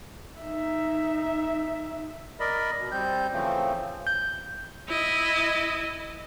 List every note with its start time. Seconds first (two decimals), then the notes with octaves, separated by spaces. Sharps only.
0.41 D#4 E5
2.40 A#4 D5 D#5 B5
2.80 B2
2.92 G3 C4 G6
3.33 C#3 E3 F3 A3 C4
4.07 G6
4.89 E4 D#5